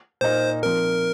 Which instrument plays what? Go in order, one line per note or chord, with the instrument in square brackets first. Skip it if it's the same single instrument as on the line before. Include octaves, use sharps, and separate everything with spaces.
[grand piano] A#2 A#3 D#4 [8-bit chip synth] C5
[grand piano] F3 C4 D#4 [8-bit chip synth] A#4